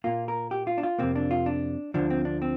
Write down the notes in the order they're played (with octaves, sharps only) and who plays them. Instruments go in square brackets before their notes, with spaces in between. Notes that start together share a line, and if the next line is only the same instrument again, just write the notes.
[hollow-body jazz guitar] A#2 A#3 F4
A#4
G4
F4
D4
F4
F2 C3 A#3 C4
D4
F4
D4
D2 D3 F3 D4
C4
D4
C4